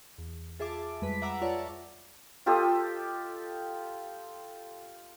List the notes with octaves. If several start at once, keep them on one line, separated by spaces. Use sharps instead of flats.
E2
F4 G#4 E5 A5 D6
F2 G3 G#3 B4 B6
E5 F#5 A#5 D6 E6
F4 C#5 D5 E5 A5 A#5
F4 G4 A4 D#5